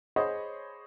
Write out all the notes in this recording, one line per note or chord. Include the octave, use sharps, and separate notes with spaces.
G#4 C5 C#5 D#5 F#5 B5